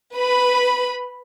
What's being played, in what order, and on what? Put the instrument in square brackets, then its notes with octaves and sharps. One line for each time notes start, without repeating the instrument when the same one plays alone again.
[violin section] B4 B5